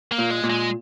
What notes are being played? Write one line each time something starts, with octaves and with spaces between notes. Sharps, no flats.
A#3
A#2
G#3
A#2
G#3